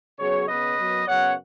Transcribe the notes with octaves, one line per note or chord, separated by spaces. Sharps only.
C#3 F#3 B3 G#4 C#5
C#3 B3 B4 D#5
F#2 F#3 B3
F#2 C#3 B3 C#5 F#5